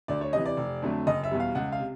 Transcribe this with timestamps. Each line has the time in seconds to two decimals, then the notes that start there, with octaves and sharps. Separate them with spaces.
0.08 D2 D5
0.21 C#5
0.33 C3 E3 D#5
0.46 D5
0.57 F1
0.82 F2 D3 F#3 A3
1.07 F#1 D#5
1.24 E5
1.31 E2 B2 G3
1.40 F5
1.55 C#2 F#5
1.72 F5
1.79 C3